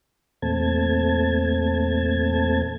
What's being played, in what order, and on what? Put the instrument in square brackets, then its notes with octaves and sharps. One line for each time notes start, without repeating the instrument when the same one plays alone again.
[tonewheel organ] E2 A#2 A3 C4 A5 G#6